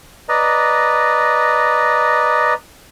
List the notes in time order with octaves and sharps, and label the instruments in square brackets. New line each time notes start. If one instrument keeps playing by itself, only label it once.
[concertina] B4 D5 D#5 A#5